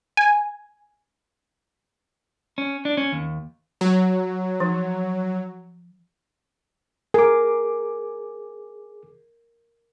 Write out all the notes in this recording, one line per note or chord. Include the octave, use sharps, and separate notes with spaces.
G#5
C#4
D4
C#4
D#2
F#3
F3
G#4 A#4 D6